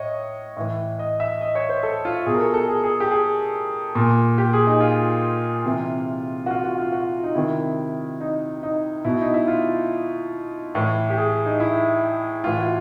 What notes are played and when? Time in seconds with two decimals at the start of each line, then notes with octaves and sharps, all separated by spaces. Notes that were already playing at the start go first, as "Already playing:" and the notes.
Already playing: A2 C#5 D#5
0.57 A2 E3
0.99 D#5
1.20 E5
1.41 D#5
1.55 C#5
1.69 C5
1.83 A4
2.05 F4
2.26 B2 G#4
2.34 A#4
2.40 A4
2.54 A4
2.68 G#4
2.83 G#4
3.00 G4
3.11 G#4
3.95 A#2
4.38 G4
4.53 G#4
4.67 D#4
4.80 F4
5.65 C3 E3
6.46 F#4
6.51 F4
6.64 F#4
6.78 F4
6.92 F#4
7.23 D#4
7.35 C3 D#3 E4
8.21 D#4
8.63 D#4
9.04 B2 E4
9.21 D#4
9.34 E4
9.48 F4
10.75 A2 E3
11.10 G4
11.17 G#4
11.46 D#4
11.60 E4
12.44 A2 E3 F4
12.59 F#4